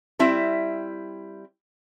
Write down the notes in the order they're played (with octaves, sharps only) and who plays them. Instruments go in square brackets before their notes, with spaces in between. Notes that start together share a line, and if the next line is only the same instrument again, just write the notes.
[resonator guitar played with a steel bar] G3 C4 E4 E5